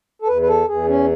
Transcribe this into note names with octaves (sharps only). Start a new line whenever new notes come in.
A4
E2 B4
B4
A4
E2 G#4
C#4